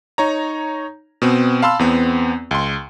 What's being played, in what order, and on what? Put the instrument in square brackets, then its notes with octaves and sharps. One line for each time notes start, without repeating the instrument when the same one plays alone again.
[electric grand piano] D#4 C#5 A#5
B2 B3 C4
F5 A5 B5 C6 E6
E2 B3 C4
C#2 C6